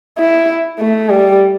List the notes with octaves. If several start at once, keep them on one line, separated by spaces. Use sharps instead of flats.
E4
A3
G3